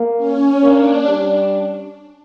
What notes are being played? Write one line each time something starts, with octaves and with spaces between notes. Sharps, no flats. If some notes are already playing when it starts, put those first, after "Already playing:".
Already playing: A#3
C#4
A#3 D4
G3